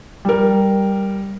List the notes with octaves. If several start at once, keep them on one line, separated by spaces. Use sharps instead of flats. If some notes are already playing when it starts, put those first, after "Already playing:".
G3 A#4